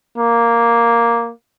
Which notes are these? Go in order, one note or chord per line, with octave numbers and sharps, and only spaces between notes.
A#3